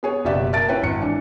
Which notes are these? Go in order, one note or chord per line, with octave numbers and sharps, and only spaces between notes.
B3 G#4 C#5
F#1 B2 B3 G4 D5 E5
A#3 A#4 E5 A5 A6 D7
C#4 E4 B4 C#5 G5
G#1 C#7
E3 D4